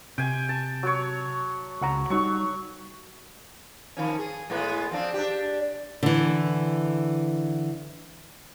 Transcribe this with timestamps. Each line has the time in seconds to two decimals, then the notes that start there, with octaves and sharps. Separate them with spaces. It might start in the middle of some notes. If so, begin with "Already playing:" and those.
0.18 C3 G5 G#5
0.49 A5
0.83 F#3 C#5
1.81 C#2 F#5 A#5
2.10 F#3 G3 D#4 C#6
3.97 D#3 F3 C#4
4.19 G#4
4.50 A2 G#3 B3
4.91 F3 C4 D4
5.14 D4 G4
6.03 D3 E3